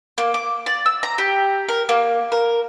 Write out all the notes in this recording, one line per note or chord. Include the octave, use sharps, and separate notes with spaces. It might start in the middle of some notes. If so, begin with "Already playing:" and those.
A#3
D6
D5
E6
A#5
G4
A#4
A#3
A#4